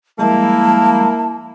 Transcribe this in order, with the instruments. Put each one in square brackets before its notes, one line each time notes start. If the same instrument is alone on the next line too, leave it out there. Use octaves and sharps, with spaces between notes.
[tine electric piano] F3 G3 G#3 [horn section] A#3 E4 [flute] A5